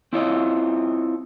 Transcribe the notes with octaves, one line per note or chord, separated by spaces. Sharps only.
C4 E4 F4 C#5 D#5